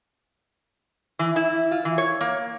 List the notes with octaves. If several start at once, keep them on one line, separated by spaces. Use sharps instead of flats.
E3
E4
F4
E3
C#5
A#3